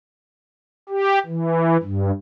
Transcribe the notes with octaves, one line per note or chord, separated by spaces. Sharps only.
G4
E3
G2